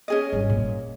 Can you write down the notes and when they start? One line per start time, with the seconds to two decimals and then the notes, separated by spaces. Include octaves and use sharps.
0.08 C#4 G#4 D#5
0.32 G#1 G3
0.50 A#2